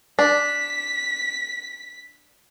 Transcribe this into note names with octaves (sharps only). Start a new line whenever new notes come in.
D4 B6